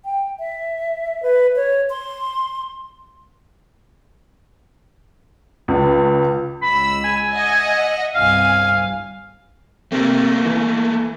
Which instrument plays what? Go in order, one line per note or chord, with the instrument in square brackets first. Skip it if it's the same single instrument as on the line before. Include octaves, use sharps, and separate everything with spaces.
[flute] G5
E5
B4
C#5
C6
[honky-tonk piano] C#2
[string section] C#2 E6 [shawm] B5
[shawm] G#5
[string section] D#5 E5 F#5
[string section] G1 C2 G#5 [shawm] F5
[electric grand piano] C3 C4 [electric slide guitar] A3 A#3
[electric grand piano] E3